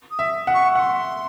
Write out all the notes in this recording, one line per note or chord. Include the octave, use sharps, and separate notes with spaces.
D#6
E5
F#5
C#6
F#5 C#6
C6